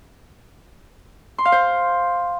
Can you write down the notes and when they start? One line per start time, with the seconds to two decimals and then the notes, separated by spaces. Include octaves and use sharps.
1.38 C6
1.45 F5
1.52 C5